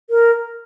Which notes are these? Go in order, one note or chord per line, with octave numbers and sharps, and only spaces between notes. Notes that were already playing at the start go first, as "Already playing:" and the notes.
A#4